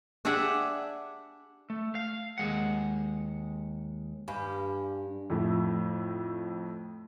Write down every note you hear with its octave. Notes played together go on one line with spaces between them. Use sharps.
D4 G4 G#4 E5 F#5
A3
F5
D#2 G#3 F#5
G2 F5 G#5 B5
F2 A2 A3